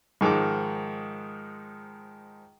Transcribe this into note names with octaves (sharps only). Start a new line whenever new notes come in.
G#2 D#3 F3 G#3 D6